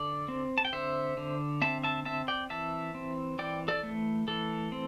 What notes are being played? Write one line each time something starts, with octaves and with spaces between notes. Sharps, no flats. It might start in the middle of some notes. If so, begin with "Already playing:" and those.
Already playing: D3 A4 D5
C4
A5
G5
D3 C5 E5
D3
C4 E5 A5
E5 A5
C4 E5 A5
D5 G5
E3 E5 A5
C4
E3 D5 G5
A4 D5
A3
E3 A4
C4